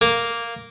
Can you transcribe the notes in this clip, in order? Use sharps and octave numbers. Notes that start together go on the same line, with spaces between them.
A#3